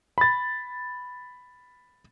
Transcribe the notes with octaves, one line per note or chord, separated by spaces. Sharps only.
B5 A6